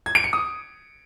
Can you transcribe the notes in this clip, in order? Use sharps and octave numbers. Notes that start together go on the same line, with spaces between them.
G#6
D7
C#7
D#6